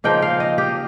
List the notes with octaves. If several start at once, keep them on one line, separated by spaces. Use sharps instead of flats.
C#3 F3 A#3 D#4 G5
F5
D#5
G4